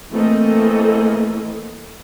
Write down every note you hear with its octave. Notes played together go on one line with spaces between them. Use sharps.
E3 A3 A#3 C4 A4 D#5